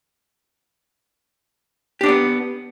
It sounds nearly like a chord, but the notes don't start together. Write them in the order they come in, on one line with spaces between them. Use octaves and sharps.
G4 D4 D5 B3